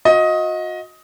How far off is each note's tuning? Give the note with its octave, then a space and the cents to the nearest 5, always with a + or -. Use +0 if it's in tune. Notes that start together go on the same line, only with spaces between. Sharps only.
F#4 -40 D#5 +15